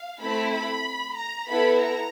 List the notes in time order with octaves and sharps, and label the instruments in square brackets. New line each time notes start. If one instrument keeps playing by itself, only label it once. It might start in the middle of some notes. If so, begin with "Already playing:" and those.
Already playing: [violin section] F5
A3 C4 E4 A4 B5
B5
A#5
B3 E4 A4 B5
A#5